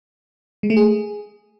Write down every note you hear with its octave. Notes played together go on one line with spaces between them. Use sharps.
G#3
A3
G#4